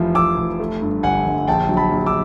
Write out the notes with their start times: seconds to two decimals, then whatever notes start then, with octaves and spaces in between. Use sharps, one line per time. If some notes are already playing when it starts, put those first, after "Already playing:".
Already playing: F1 E3 F3
0.15 F3 D6 E6
0.38 F1
0.59 A3
0.82 G2
1.03 G1 F#5 G#5
1.26 G1
1.48 A#1 G5 A5
1.69 F#3
1.77 A5 B5
1.92 A#1
2.06 D6 E6